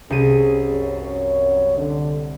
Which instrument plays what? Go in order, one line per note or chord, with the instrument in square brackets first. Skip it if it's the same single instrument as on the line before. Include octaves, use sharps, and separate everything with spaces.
[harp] C2 D#7 [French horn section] C#4 G#4
[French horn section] F#2 C#5
D3